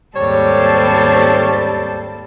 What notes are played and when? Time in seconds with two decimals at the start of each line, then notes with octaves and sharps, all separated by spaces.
0.16 D#2 G#2 G3 C4 A4 C#5